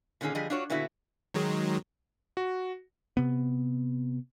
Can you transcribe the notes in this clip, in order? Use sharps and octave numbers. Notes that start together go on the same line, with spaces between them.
A#2 D3 D#3 C#4 G#4
D3 F3 G3 G#4 D#5
D4 F4 F#4 C#5
A#2 D3 B3 E4 F#4
D#3 F#3 G#3
F#4
C3 B3